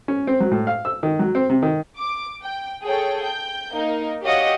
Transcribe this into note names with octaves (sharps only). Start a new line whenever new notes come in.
C#4
C4
F#3
A2
F5
E6
D#3
F#3
C4
C3
D#3
D6
G5
G#4 A4 C#5 G5
G5 G6
A#3 D#4 A#4
F#4 G4 C#5 D#5 F5 F#5